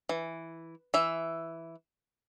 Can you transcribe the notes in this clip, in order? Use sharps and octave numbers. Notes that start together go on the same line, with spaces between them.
E3
E3 E5